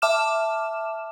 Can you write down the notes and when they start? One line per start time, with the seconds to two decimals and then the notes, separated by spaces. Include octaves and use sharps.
0.02 E5 A5 D6 F6 E7